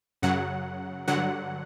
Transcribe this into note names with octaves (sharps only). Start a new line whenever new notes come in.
F#2 C#3 F#3 F#5
G2 D3 F#3 F#5